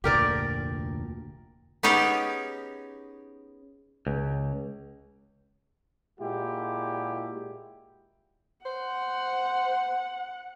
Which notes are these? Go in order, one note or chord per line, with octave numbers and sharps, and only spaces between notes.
F1 D2 A#2 G4 A#4 D5
B3 C#4 D#4 G4 G#4
C#2
A#2 G#3 E4 F#4 G4
C5 F#5